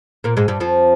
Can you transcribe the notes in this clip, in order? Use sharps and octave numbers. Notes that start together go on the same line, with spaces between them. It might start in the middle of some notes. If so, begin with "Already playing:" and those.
A#2 A#3
G#2 G#3
G2 G3
F2 F3